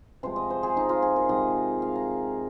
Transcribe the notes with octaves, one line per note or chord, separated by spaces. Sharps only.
C3 F3 G#3 C5
D#5
C5
G#4
D#4
F4
G#4
A#4
C3 D#3 G#3 D#5
F5
A#5